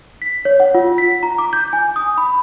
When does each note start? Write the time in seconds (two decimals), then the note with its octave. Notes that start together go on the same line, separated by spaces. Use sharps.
0.22 B6
0.45 C#5
0.60 F#5
0.74 F4
0.98 B6
1.23 A#5
1.38 D6
1.53 G6
1.73 G#5
1.96 D#6
2.18 B5